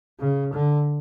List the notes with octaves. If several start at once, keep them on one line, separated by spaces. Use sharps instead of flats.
C#3
D3